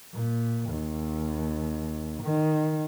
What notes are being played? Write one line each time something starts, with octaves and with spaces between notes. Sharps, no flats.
A#2
D#2
D#3